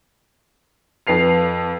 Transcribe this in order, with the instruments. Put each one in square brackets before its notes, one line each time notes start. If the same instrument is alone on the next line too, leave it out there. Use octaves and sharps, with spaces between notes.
[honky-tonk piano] F2 B4 C7 F7